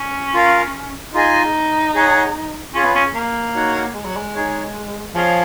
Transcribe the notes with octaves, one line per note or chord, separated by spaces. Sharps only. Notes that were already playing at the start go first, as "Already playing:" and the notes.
Already playing: C#4
F4 A#4 F5
D#4 F4 G#4 D#5 G#5
G#4 C#5 F#5
C#4 F4 G#4 C#5
B3
C#4
A#3
D#4 F#4 C#5 F#5
G#3
F#3
G#3
D#4 G#4 C#5
F3 G#4 C#5 F5